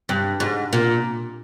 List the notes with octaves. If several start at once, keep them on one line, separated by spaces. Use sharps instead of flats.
G2
G#2
A#2